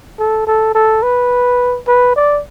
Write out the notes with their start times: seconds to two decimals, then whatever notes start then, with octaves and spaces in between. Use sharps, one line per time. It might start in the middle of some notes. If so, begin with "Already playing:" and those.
0.19 A4
0.47 A4
0.75 A4
1.02 B4
1.87 B4
2.16 D5